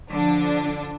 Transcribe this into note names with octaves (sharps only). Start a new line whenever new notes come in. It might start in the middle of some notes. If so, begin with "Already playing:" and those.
D3 F3 D4